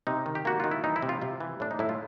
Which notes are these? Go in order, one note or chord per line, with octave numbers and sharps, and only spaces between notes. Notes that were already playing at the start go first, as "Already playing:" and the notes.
C3 D#4
D#3
G4
A#3 F#4
D#3 F4
E4
E3 D#4
E4
C3
F4
C3 F4
E3
A2 D4
D#4
A2 E4
F4